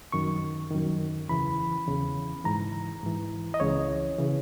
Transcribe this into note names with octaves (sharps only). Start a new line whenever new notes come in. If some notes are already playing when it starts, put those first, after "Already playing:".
F#2 D#3 C#6
F#2 D#3
E2 C#3 E3 B5
E2 C#3 E3
G#2 E3 A#5
G#2 E3
D#5
C#2 C#3 E3 C#5
C#3 E3